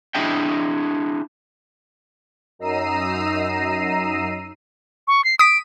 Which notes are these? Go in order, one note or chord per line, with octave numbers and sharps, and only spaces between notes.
D4 E4 G#4 D#5 E5 G5
F#2 D#4 A#5 E6 C7 D#7
C#6
C7
D#6 B6 D7